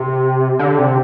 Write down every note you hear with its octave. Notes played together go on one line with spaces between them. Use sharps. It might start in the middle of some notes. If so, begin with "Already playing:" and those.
Already playing: C3
D3
C3